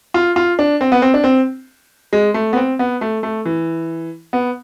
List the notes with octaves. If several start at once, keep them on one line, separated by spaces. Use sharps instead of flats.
F4
F4
D4
C4
B3
C4
D4
C4
G#3
A3
B3
C4
B3
A3
A3
E3
B3